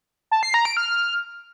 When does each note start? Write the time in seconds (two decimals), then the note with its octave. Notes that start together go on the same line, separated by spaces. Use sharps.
0.31 A5
0.43 C7
0.54 A#5
0.65 D7
0.77 F6